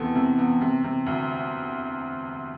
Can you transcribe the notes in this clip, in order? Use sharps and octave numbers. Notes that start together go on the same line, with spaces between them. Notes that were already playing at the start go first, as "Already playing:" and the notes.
Already playing: E2 C3 B3 A4
C3
B3
C3
C3
D2